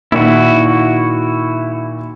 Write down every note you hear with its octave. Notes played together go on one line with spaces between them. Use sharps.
A#2 D#3 E4 F#4